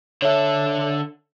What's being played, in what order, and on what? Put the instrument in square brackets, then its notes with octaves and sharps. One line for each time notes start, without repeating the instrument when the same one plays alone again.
[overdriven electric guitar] D3 A4 [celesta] C#5 E5